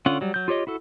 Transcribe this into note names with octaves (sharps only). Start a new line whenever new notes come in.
D3 C#4 F4 F#5
F#3 G3
F#3 G6
F4 G4 C#5 D#5
E4 F#4 A4